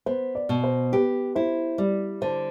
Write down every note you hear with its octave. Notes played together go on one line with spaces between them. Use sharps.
B3 C5
D5
B2
C5
G4 B4
E4 C5
G3 D5
D3 C5